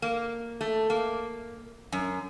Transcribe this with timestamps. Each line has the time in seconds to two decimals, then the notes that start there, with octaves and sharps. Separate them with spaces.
0.02 A#3
0.61 A3
0.90 A#3
1.92 F#2